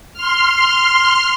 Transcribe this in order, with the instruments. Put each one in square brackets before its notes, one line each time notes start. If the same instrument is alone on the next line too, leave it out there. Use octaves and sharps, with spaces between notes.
[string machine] C6 F6